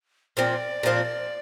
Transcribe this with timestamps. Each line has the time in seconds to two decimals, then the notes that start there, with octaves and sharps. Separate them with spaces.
0.37 A#2 F3 C4 D5
0.83 A#2 F3 C4